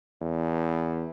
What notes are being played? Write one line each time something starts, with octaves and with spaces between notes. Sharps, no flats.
E2